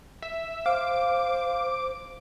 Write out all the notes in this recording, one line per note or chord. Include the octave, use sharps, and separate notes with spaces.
E5
C5 F5 D6